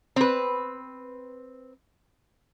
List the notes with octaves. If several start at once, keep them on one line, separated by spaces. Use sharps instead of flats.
C4 B4